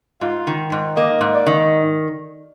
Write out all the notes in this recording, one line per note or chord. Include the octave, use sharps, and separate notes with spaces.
G#2 F4
D#3
G#2
A#3 D#5
G#2
D5
D#3